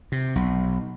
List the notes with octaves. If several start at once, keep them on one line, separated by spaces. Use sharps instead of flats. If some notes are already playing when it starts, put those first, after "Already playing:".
C3
B1